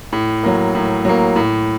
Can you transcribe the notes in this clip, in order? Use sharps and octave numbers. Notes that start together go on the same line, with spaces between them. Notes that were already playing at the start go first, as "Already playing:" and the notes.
A2
F#3 A#3
A2
F#3 A#3
A2